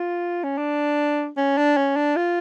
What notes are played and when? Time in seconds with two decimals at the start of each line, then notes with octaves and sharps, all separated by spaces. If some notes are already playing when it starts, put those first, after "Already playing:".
Already playing: F4
0.44 C#4
0.58 D4
1.37 C#4
1.58 D4
1.77 C#4
1.96 D4
2.16 F4